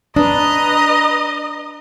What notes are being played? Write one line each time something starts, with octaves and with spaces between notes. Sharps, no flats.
D4 B4 D#5 A#5 D#6